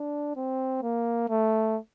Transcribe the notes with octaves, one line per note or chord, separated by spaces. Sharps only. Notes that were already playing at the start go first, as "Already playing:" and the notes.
Already playing: D4
C4
A#3
A3